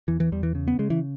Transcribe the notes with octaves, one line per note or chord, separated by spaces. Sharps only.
E2 E3
E3
E2 G3
E3
C#3
B3
C#3 G#3
E3